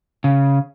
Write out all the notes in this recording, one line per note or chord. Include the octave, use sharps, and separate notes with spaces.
C#3